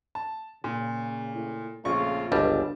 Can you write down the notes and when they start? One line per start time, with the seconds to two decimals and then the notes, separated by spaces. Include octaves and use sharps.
0.15 A5
0.64 A#2 C#3
1.35 A2
1.85 A#1 C#3 A3 C4 F4 C#6
2.32 G1 C#2 B2 G3 D4 A5